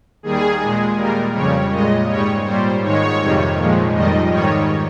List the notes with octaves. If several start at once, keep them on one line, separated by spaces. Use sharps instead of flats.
D#2 D#3 G3 G#4
A#2 G#3
A#2 G3 A#4
F2 C#3 G3 C#5
A#2 G#3 D#5
G#2 G3 C#5
A#2 G3 C5
G#2 D#3 G#3 C#5
F2 C3 D#3 G3
A#2 F3 G#3
F2 D#3 G3 D#5
G#2 D#3 G3 C#5